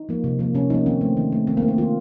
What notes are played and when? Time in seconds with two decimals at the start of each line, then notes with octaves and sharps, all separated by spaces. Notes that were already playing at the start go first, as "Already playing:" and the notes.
Already playing: D#4
0.09 F3 A#3
0.24 C3
0.39 F3 A#3
0.54 C3 C#4
0.70 F3 A#3 D#4
0.86 D#3 C4
1.01 A3
1.17 D#3
1.32 A3
1.47 D#3 C4
1.57 A#3
1.62 A3
1.68 A#3
1.78 D#3 F4